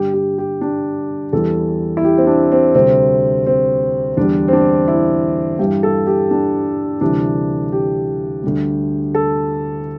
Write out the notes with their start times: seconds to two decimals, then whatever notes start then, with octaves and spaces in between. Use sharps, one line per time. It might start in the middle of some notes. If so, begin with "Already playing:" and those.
Already playing: G2 D3 G3 G4
0.13 G4
0.38 G4
0.61 D4
1.33 E2 E3 G3 A4
1.97 E4
2.04 G4
2.18 C4
2.27 D4
2.52 C4
2.75 D2 C3 G3 C4
3.46 C4
4.17 E2 D3 G3 D4
4.48 C4
4.53 D4
4.88 E4
5.59 G2 E3 G3 G4
5.83 A4
6.07 G4
6.31 D4
7.01 D2 C3 E3 G3 D4
7.72 G4
8.43 D2 D3 G3
9.15 A4